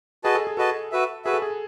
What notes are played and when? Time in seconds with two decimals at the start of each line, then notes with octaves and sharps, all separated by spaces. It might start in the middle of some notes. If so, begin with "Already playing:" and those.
0.24 F#4 G#4 B4 D#5 A5
0.35 A4
0.47 G#4
0.57 F#4 A4 B4 D#5 A5
0.92 F#4 B4 E5
1.25 F#4 G#4 B4 E5
1.34 A4
1.42 G#4